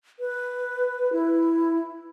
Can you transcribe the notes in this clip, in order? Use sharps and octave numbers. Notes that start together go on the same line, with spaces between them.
B4
E4